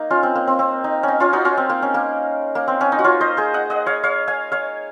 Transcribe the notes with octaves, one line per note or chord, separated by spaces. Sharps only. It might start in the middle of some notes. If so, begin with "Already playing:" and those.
Already playing: A#3 D#4
C#4 F4
C4
A#3
C4
C4
D#4
C#4 D#4
C#4 F4
D#4 F#4
C#4 F4
C4
A#3
C#4
A#3
A#3
C4
C#4
D#4
F#4
C#4 F4
C5 D#5
G#4 C5
D#5 F#5
D#5 F#5
C#5 F5
C#5 F5
F5 G#5
C#5 F5